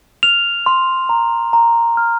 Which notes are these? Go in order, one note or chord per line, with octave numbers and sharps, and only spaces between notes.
F6 F7
C6
A#5
A#5
F6